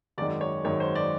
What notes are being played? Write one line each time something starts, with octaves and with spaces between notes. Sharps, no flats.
G#1 F#2 D#3 G#3 D5
C#5
G#1 F#2 D#3 G#3 C#5
C5
D5